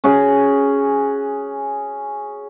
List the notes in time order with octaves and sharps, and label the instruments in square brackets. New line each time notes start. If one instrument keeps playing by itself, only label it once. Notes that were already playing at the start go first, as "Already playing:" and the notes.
[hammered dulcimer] C#4 F#4 G#4